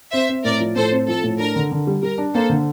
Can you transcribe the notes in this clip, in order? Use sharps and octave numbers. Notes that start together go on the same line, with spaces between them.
C4 C5 E5
C4
A2 A#4 D5
F3
A2 A4 C5
C4
F3 A4
A2
D4 A#4
D3
D3
G3
G3 A#4
D4
A#3 A4 C5
D3